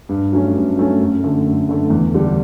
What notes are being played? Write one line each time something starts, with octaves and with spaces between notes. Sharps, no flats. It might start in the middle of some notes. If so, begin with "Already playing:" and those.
G2
F#3 A3 C#4
G2
F#3 A3 C#4
F#2
D3 A3
F#2
D3 A3
E2
D3 G3 D4 G4